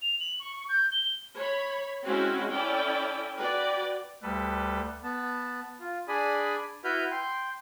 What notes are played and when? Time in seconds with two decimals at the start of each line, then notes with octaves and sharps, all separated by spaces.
0.02 F7
0.20 F#7
0.40 C#6
0.56 C#6
0.69 G6
0.92 G7
1.36 C#5 B5
2.05 G#3 C4 C#4 E4 F#4
2.50 C#4 E4 A4 D5 G5
3.38 F#4 B4 D5 G5
4.22 D2 G3 A4 B4
5.03 B3 A5
5.80 F4
6.08 D4 G#4 D5 G#5 B5 D#6
6.84 E4 F#4 B4 E5 F6 G6
7.11 G5 C6